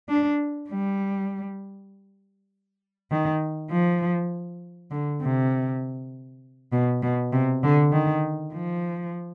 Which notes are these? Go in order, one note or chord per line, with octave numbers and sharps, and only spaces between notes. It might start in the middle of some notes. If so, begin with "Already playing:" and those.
D4
G3
D#3
F3
D3
C3
B2
B2
C3
D3
D#3
F3